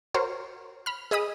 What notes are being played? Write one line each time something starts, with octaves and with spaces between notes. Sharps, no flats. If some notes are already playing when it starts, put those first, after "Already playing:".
F#4 A#4 C5 C#5
B5 F6
G#4 D#5 B5 D#6